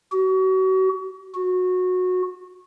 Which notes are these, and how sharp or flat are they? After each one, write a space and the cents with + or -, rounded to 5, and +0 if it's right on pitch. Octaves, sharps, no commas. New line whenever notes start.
F#4 +35
F#4 -15